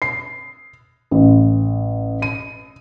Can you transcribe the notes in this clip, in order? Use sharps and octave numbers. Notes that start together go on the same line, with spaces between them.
C7
A1
D#7